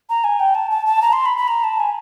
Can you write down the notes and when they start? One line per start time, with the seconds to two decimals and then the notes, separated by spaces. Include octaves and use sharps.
0.09 A#5
0.24 G#5
0.40 G5
0.55 A5
0.71 A5
0.86 A5
1.02 A#5
1.13 C6
1.25 B5
1.37 B5
1.48 A#5
1.64 A5
1.80 G#5